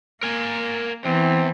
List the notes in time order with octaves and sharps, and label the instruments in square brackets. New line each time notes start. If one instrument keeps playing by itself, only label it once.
[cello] A#3 [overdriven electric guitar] A#4 G#5
[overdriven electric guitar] E2 [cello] E3 [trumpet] C4